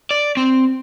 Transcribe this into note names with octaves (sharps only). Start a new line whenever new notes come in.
D5
C4